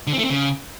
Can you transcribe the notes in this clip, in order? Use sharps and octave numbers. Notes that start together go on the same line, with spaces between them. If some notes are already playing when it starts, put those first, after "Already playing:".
D3
C4
A3
C4
C#3